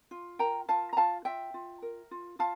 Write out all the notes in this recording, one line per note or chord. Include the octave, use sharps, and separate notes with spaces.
F4
A#4 G5 A#5
F4 F5 A5
A#5
F4 F5 A5
F4 E5 G5
F4
A#4
F4
F4 F5 A5